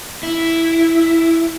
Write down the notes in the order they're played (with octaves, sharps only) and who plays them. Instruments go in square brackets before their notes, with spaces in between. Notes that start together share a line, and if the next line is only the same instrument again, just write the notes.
[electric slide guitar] E4